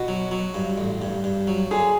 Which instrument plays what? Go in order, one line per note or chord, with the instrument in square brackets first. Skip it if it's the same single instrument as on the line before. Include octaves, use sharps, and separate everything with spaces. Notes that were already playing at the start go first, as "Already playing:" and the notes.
Already playing: [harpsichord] B2 [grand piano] F#4
[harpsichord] F#3
F#3
G2
A1
G2
G2
F#3
[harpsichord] D3 [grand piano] G#4